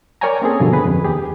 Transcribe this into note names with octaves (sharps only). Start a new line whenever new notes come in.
A#4 C#5 D5 G5 G#5 A#5
A#3 C4 C#4 G#4 A4
G2 B2 D3 F3 G3
G#4 B4
F2
D#2 G4 G#4